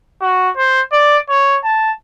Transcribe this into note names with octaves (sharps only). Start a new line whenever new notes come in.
F#4
C5
D5
C#5
A5